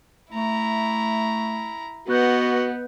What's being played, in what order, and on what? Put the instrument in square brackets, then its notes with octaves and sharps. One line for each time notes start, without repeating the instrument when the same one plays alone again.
[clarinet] A3 [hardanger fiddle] E4 A#5
[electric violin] B3 [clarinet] F#4 [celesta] B4 F#6 G6 [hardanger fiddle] D#5 F#5